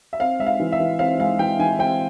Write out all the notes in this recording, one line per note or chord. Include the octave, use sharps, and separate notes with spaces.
E5
C4 F5
G#3 E5
F5
E3
E5
E3
C4 F5
G#3 F5
E3 G5
E3 G#5
C4 G5